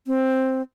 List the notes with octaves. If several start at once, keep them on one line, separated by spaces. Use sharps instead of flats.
C4